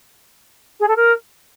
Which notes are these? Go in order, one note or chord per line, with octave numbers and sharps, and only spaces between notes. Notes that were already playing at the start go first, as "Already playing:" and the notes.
G#4
A4
A#4